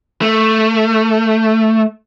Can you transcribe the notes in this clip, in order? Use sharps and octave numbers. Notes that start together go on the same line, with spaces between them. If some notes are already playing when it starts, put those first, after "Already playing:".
A3